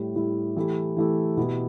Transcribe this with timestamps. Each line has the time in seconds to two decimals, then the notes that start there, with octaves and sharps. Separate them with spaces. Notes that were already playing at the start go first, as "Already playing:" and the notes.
Already playing: A2 G3 E4 G4
0.15 A2 G3 E4 G4
0.56 E3 A3 E4 G4
0.97 E3 A3 E4 G4
1.37 B2 B3 E4 G4